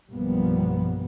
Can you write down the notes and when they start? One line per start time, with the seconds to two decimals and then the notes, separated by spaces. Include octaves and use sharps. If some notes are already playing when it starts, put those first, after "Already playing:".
0.11 B1 G2 F3 G3 A#3 B3